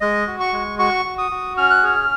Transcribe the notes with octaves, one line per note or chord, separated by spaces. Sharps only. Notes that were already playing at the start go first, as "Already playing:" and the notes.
G#3 D#5
F#4
C#6
G#3
F#4 C#6
F#4
D#6
F#4
C#4 F6
F#6
G#4 F6